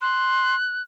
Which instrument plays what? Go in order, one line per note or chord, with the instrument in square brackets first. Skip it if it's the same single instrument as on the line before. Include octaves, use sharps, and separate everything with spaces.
[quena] C6 [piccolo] F#6